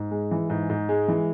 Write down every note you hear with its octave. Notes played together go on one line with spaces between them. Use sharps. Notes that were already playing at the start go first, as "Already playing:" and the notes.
Already playing: G#2
G#3
E3
G#2
G#2
G#3
E3